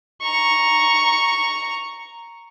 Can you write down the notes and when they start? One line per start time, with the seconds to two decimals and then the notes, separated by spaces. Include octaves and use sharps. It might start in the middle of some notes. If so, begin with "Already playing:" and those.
0.22 A#5 C#6